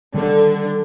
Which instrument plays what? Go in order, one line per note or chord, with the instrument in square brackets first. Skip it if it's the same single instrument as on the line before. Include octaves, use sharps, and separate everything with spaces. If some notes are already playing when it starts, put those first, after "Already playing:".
[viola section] D3 [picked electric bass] D#3 G3